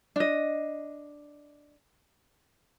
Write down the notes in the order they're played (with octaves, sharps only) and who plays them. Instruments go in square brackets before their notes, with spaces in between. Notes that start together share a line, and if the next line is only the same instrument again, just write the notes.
[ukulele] D4 D#5